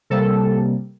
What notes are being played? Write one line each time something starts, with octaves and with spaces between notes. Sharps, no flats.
C3 G3 A#3 A4